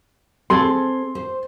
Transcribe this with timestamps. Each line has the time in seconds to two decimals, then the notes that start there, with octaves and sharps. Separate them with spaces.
0.50 C4 G#4 A4 C6
1.15 C5